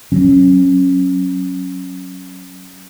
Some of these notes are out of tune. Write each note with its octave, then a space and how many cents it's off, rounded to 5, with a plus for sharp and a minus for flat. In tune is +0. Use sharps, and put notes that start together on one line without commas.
F#3 +0 C#4 -15